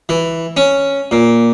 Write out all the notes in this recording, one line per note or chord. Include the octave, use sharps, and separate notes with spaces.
E3
C#4
A#2